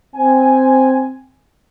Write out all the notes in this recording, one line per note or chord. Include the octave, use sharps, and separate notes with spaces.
C4 G#5